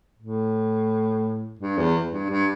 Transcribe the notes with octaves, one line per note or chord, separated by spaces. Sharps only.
A2
G2
E2
G2
G2